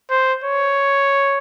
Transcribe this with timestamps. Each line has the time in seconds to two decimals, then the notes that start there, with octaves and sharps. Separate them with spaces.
0.10 C5
0.44 C#5